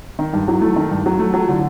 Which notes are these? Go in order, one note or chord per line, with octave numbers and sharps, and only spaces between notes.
D#3
G2 D#4
F#3 E4
A3 E4
D#3
G2
F#3
A3
F#3 F4
D3 E4